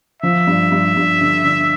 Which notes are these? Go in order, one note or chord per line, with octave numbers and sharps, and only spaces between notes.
F3 E5
G2
G2
G2
D3
D3